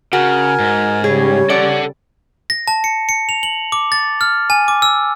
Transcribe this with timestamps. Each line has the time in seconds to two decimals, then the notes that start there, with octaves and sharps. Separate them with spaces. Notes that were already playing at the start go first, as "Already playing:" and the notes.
0.13 C#3 F#4 A#4 G#5
0.59 G#2
1.04 C#3 G3 C#4 G#4 C#5
1.50 A4 D5 F#5
2.50 A#6
2.68 A5
2.84 C#7
3.09 C#7
3.29 F7
3.43 F#7
3.72 D6
3.92 A6
4.21 F6
4.50 G#5
4.68 D6
4.82 E6